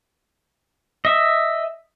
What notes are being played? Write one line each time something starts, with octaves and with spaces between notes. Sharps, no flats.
D#5 E5